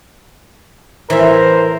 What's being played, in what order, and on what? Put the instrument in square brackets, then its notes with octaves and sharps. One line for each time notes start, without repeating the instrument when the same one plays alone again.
[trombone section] A2 A#4 C5 [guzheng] E3 E5